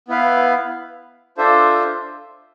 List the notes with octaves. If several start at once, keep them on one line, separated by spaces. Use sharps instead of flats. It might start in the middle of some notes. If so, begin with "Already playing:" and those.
B3 E4 B4 F5
D4 F4 A4 C5 E5